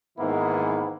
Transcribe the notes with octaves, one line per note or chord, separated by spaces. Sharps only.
G#2 D#3 E3 A#3 B3 E4